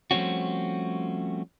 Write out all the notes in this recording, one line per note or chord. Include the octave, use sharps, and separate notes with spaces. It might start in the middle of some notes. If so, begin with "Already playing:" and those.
F3 G3 A3 C4 C#4 F#4